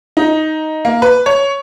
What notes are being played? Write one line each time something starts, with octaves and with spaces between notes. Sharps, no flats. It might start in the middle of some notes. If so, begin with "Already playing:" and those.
D#4
A#3
B4
C#5